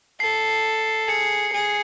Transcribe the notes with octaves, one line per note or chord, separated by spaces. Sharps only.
A4 C7
G#4 C#7
G#4